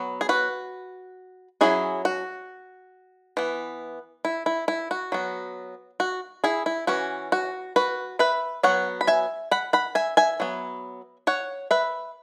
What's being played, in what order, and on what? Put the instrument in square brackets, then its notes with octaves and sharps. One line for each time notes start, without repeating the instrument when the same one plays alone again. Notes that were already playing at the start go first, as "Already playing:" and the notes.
Already playing: [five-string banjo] F#3 B3
G#4
F#4 B4
F#3 C#4 E4 G#4
F#4
E3 B3
E4
E4
E4
F#4
F#3 B3
F#4
E4 G#4
E4
E3 C#4 F#4
F#4
F#4 B4
B4 E5
F#3 B3 C#5 F#5
B5
E5 G#5
F#5 B5
F#5 B5
E5 G#5
E5 G#5
F#3 B3
C#5 F#5
B4 E5